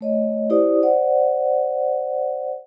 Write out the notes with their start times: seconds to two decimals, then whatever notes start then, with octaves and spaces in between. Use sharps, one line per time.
0.01 A3 C#5 D#5
0.50 E4 G4 C5 D5 D#6
0.83 C5 D5 F#5